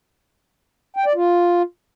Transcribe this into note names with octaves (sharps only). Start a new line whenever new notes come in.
G5
D5
F4